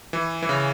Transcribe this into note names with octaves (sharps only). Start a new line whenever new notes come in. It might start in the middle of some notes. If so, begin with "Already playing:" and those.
E3
E3
C#3